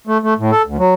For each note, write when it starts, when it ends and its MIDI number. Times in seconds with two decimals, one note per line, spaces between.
0.07 0.18 57
0.23 0.34 57
0.39 0.51 45
0.51 0.62 69
0.66 0.77 38
0.78 0.94 54